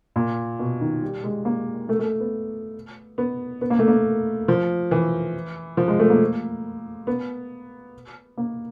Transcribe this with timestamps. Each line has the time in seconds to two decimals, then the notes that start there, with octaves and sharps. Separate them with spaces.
0.16 A#2
0.59 B2
0.81 D#3
1.02 G3
1.24 G#3
1.45 A#3
1.89 A3
1.99 A3
2.20 B3
3.18 B3
3.61 B3
3.70 A#3
3.79 A3
3.88 A#3
4.48 F3
4.91 E3
5.77 F3
5.88 G#3
5.99 A3
6.10 A#3
7.07 B3
8.37 A#3